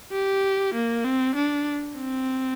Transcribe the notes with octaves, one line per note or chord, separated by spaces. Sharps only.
G4
A#3
C4
D4
C4